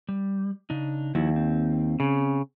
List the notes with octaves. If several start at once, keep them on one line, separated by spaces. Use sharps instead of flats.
G3
C#3 D4 D#4
D#2 F3 E4 F#4
C4
C#3